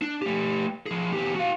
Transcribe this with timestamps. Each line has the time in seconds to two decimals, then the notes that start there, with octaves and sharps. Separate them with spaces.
0.02 D4
0.22 A3 G4
0.86 F3 G#4
1.13 E2 G4
1.35 F#4 F5